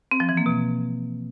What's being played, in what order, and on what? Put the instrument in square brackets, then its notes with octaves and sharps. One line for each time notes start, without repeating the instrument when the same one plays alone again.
[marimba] C4
F3
E3
A#3
B2